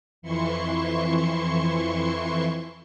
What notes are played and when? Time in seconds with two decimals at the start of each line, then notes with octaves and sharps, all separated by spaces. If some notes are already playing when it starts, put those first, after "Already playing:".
0.22 F2 E3 E4 C6 C#6 C#7